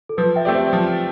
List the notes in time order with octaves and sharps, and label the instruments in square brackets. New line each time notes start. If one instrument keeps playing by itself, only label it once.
[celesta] A4
[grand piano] F3 [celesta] B4
[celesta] E5 G5
[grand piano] A3 C4 G4 D5
[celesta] C5 E5
[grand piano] F3